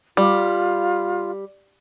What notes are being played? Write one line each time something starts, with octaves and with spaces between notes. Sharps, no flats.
G3 F4